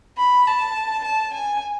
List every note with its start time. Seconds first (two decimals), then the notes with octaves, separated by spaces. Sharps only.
0.18 B5
0.47 A5
1.05 A5
1.34 G#5